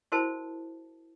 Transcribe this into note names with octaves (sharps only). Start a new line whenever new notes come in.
E4 F#4 A#4 C5 E5 A5